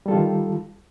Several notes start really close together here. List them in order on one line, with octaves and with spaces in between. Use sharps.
G3 A4 F4 D#3